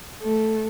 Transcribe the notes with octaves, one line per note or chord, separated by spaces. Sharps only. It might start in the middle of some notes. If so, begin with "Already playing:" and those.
A3